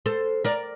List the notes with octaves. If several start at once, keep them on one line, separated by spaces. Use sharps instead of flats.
A4 C5
A#4 D5